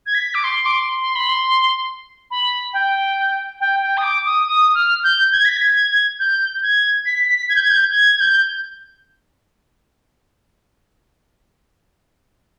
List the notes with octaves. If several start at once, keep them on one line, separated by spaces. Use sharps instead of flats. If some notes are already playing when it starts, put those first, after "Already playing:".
G#6
B6
D6
C6
D6
C6
C6
B5
C6
B5
G5
G5
G5
D#6
D6
D#6
D#6
F6
G6
G#6
B6
G#6
G6
G#6
B6
B6
G#6
G6
G#6
G6
G#6
G#6
G6